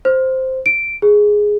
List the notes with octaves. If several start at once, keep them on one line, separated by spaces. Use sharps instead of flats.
C5
D7
G#4